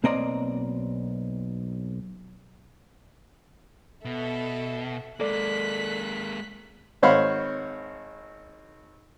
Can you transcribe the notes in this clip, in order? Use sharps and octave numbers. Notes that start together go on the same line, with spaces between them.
B1 A#3 C4 D5 D#5 A#5
B2 A4 E5
G#3 A#3 A4 D5 F#6 B6
G#1 C5 C#5 F5 F#5 B5